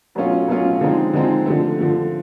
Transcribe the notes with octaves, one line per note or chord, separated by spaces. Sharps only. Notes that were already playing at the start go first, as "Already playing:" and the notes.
B2 F#3 A3 C#4 F4
B2 F#3 A3 C#4 F4
D3 F3 G#3 C4 D#4
D3 F3 G#3 C4 D#4
D3 F3 A3
D3 F3 A3